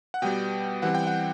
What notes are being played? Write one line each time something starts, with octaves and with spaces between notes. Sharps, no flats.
F#5
B2 G3 B3 G5
E3 G3 C4 F#5
G5
F#5